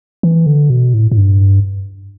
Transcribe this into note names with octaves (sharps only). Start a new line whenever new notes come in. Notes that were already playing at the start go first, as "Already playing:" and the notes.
E3
D3
B2
A2
A2
G2